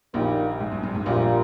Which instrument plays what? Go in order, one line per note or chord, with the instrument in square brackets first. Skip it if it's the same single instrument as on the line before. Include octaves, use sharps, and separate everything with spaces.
[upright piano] A#1 A#2 [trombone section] D#3 G3 A#3
[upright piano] G#2
G2
G2
G#2
[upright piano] A#1 A#2 [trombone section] G3 A#3 F4
[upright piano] A#2